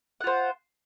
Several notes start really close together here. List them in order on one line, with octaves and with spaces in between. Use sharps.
F#5 F4 C5